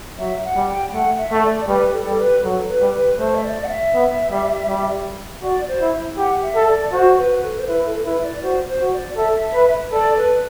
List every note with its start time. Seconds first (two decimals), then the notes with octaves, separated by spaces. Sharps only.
0.18 F#3 E5
0.44 F#5
0.56 G3
0.68 G5
0.93 A3 F#5
1.18 E5
1.31 A3
1.44 D5
1.68 G3 B4
1.93 A4
2.07 G3
2.19 B4
2.44 F#3 A4
2.68 B4
2.82 G3
2.93 B4
3.18 A3 C5
3.35 E5
3.44 D5
3.64 F#5
3.69 E5
3.94 B3
4.31 G3
4.68 G3
5.42 F#4 D5
5.68 C5
5.81 E4
6.17 G4 F#5
6.42 E5
6.55 A4
6.68 D5
6.92 F#4 C5
7.18 B4
7.43 A4
7.59 C5
7.67 E4 B4
7.86 A4
7.99 A4
8.05 E4 B4
8.23 D5
8.43 F#4 C5
8.67 C5
8.80 F#4
8.93 D5
9.17 A4 E5
9.54 B4
9.92 A4 D5
10.17 B4